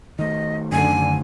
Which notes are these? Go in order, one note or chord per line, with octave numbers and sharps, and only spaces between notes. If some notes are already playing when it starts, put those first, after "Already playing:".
D#3 A3 D#5
F#2 D3 G#5